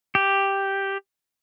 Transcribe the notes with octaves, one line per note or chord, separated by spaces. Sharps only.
G4